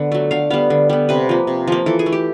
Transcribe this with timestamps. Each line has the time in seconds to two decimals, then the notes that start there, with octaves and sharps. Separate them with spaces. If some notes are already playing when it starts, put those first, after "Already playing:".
Already playing: D3 B3 F#5
0.12 F#3 A3
0.31 D3 F5
0.50 G3 B3 F5
0.70 D3
0.90 G3 B3
1.09 C3 B4
1.29 F3 A#3
1.47 C3
1.67 F3 A#3
1.86 E3 A4
1.99 G#4
2.06 A3
2.12 G4